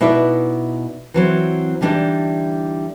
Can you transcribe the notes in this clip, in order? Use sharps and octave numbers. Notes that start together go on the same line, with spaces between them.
B2 D#4 E4 B4 D5
E3 F#3 C4
D3 E3 G3 D4 D#4